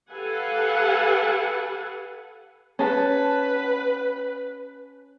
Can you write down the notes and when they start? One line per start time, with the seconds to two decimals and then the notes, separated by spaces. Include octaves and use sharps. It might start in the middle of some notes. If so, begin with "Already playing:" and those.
0.11 G4 A4 B4 F5 F#5 G#5
2.79 C#4 B4 A5